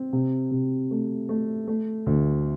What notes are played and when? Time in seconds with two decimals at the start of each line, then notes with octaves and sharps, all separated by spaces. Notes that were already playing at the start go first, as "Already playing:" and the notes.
Already playing: C4
0.13 C3
0.51 C3
0.91 A3
1.29 A3
1.67 A3
2.06 D2